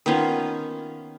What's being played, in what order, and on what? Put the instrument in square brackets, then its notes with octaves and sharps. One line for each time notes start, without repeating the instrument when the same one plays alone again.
[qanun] D#3 B3 C#4 F4